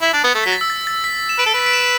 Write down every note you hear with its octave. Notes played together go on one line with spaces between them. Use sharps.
E4
D4
B3
A3
F#3 B6
A6
E6
A6
A6
B6
E7
B4 D7
A4
B4 B6
D7
E7